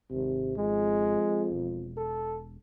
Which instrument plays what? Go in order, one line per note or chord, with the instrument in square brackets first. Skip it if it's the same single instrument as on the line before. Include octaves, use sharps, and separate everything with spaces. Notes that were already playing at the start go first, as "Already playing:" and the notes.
[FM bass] G#1 [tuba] C3
[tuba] F2 [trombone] G#3
[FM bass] E1
[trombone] A4